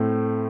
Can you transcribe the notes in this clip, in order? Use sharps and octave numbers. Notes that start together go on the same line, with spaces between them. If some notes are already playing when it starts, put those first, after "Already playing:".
Already playing: A2 A3 C4